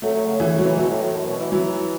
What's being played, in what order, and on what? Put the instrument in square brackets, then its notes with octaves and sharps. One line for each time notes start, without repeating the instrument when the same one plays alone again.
[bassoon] F#3 [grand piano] A3
[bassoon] F#3
C#3
[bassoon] F#2 [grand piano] E3
[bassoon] C#3
[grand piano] F#3
[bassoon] E3
[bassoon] B2 [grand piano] F#3
[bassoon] A2
A2
F#2
B2
E3
[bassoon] E3 [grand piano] F#3